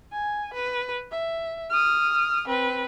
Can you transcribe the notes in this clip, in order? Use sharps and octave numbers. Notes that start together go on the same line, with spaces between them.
G#5
B4
E5
D#6 F6
C4 B4